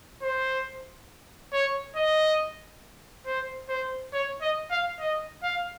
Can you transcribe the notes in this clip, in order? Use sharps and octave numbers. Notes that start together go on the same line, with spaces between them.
C5
C#5
D#5
C5
C5
C#5
D#5
F5
D#5
F5